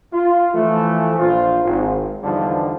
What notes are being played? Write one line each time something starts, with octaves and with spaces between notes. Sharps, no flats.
F4
E3 F3 A3
A#1 F4 C5
G#1
E2 G2 D3 F3 G3 D#4